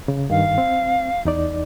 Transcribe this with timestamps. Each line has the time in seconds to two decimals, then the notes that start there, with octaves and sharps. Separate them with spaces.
0.08 C#3
0.30 G2 D#3 F5
0.58 C4
1.25 E2 D#4 D5